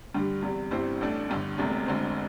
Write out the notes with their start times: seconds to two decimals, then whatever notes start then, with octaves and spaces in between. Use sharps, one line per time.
0.14 G2 D3 G3
0.42 E2 C3 G3
0.71 G1 G2 G3 C4 E4
1.01 A1 A2 A3 D4
1.29 G1 G2 D3
1.58 E1 E2 C3 A3
1.86 E1 D2 D3 C4